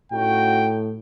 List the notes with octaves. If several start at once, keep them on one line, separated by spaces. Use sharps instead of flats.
A2 C#4 D#4 F#4 G5